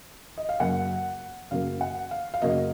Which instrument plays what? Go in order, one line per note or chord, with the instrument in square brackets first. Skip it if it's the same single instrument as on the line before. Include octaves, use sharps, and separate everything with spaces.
[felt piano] D#5
F5
F#2 C#3 F#3 A#3 F#5
F#2 C#3 F#3 A#3 F5
F#5
F5
F5
F#2 C#3 F#3 A#3 D#5